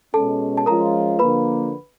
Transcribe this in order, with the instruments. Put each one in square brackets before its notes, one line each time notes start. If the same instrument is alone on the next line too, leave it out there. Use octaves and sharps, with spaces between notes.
[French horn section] B2 G#3 C#4 [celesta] A4 A5
[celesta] A5
[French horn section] F3 G#3 C#4 F4 [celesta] A#4 A#5
[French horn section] D3 F3 A#3 [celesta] B4 B5